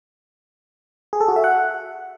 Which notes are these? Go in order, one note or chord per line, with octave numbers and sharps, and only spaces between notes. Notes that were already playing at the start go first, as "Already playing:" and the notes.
G#4
A4
F#4
E5
F#5